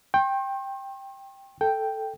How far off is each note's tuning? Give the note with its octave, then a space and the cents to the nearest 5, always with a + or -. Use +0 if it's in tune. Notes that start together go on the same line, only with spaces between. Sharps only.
G5 +5 C6 +45
A4 +0 G5 +0